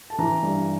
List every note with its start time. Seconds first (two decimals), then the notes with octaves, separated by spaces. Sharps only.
0.10 A5
0.19 E3 A#5
0.43 G2